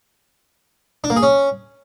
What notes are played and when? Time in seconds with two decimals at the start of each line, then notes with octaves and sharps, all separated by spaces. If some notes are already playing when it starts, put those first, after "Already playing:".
1.04 D4
1.10 A#3
1.16 G#4
1.23 C#4